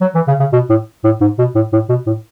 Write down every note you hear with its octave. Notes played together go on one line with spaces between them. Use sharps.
F#3
E3
C#3
C#3
B2
A2
A2
G#2
B2
A2
A2
B2
A2